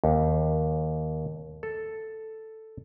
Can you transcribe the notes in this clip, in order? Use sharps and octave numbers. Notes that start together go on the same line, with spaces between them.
D#2
A4